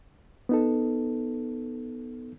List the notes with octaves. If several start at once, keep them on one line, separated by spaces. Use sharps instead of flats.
B3 D#4 A4